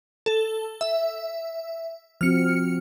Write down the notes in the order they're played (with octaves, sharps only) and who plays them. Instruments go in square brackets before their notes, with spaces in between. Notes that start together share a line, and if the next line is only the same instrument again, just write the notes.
[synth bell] A4
E5
[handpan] F3 C4 F#4 [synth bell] F6 C#7